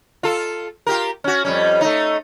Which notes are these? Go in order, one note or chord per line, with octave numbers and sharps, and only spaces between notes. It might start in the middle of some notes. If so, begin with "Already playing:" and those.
F4 A4
F4 G4 A#4
C#4 F#4
F2 G3 C#4
A3 D#4